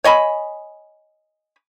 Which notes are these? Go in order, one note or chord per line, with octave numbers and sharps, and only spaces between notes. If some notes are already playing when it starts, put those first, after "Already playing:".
C#5 D#5 G#5 B5